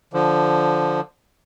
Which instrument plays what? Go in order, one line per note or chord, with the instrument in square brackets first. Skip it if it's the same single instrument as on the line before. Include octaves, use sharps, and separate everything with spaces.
[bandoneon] D3 F3